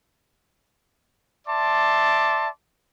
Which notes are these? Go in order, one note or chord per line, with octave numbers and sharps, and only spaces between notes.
D5 E5 A5 C6 D6